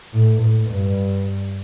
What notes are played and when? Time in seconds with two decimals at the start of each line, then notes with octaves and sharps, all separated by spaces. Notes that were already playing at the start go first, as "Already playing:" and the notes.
0.13 A2
0.41 A2
0.70 G2